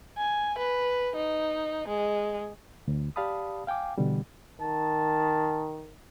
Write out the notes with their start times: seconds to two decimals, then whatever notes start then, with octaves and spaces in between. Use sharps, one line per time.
0.18 G#5
0.58 B4
1.16 D#4
1.88 G#3
2.88 D2
3.16 G4 D5 F5 A5 B5 D#6
3.67 F5 G5 G#5 D6
3.98 B2 D3 E3 G3
4.61 D#3 A5